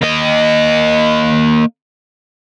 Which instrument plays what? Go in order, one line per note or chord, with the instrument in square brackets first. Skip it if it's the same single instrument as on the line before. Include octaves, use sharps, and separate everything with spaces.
[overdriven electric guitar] A#3 D#5